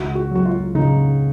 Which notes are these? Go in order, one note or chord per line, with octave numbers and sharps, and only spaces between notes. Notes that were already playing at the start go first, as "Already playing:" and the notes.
Already playing: C#2 F#4
F#4
F#3 F#4
F4
C#3 D#4